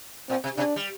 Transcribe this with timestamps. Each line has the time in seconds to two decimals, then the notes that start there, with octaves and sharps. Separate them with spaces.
0.29 A#2 C4
0.44 C3
0.57 C3 D4
0.76 G3